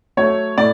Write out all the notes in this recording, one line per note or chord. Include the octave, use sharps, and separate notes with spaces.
F#3 A3 C#5
A2 D5